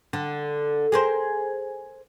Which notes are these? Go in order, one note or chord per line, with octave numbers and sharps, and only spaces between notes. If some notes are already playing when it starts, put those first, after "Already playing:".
D3
G#4 A#4 C5